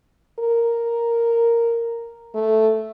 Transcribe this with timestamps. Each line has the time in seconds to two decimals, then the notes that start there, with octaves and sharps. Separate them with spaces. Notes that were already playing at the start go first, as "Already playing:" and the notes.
0.39 A#4
2.35 A3